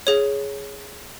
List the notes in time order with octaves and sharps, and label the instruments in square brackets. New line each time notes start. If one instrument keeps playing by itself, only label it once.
[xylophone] G#4 C#5